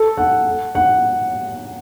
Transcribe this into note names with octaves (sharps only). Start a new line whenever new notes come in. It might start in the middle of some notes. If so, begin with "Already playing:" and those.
Already playing: A4
F#5
F#5